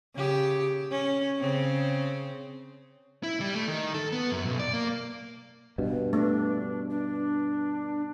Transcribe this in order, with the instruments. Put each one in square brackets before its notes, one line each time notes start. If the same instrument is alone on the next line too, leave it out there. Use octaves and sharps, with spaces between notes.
[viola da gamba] C#3 G4
C#4
C#3 C4
[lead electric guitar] E4
G3
A3
D#3
A4
B3
F#2
B1
D5
A#3
[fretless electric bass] G2 B2
[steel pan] A3 [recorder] D4
[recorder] D4